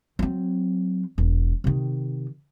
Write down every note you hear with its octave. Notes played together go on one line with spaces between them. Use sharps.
F#3 C4
E1
C3 D#3